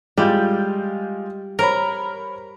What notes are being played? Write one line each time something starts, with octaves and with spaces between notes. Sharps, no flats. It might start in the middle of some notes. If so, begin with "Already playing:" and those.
G3 G#3 F4 G6
A#4 C5 C#5 B5